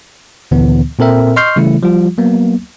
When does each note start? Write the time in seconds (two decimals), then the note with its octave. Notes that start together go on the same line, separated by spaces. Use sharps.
0.51 D2 A#2 D3 E3 B3
0.99 A#2 C4 A4 A#4 E5 G5
1.36 D#5 C6 C#6 F6 G6 C7
1.56 C#3 E3 G3 A3 E4
1.83 F3 G3 F4
2.18 F#3 A#3 B3